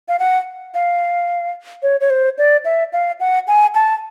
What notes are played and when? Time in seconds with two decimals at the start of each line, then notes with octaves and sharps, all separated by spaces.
0.08 F5
0.19 F#5
0.74 F5
1.83 C#5
2.01 C#5
2.10 C5
2.38 D5
2.65 E5
2.93 F5
3.20 F#5
3.48 G#5
3.75 A5